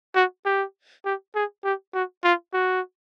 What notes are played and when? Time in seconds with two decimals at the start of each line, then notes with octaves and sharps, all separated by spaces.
0.15 F#4
0.45 G4
1.05 G4
1.35 G#4
1.64 G4
1.94 F#4
2.24 F4
2.54 F#4